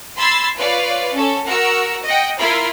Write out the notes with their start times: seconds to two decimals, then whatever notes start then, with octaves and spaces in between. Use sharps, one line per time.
0.18 B5 C6 E6 G#6 A6 C7
0.57 F4 B4 C#5 D5 F5
1.13 C#4 A4
1.46 F#4 A#4 F#5 E6
2.04 D#5 F#5 G5
2.39 E4 F4 A#4 B5 C6